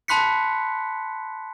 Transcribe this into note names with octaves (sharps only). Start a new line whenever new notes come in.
A5 B5 C6 F#6 B6 C#7